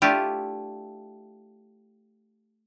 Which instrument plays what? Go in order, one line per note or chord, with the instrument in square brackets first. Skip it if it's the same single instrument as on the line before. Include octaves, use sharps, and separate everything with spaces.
[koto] A3 D4 E4 F4 G4